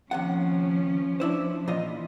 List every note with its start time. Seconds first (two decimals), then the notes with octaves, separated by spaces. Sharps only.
0.11 D#2 C3 F3 C#4 F#5
1.20 D4 E4 C5
1.68 A#2 E3 F4 D#5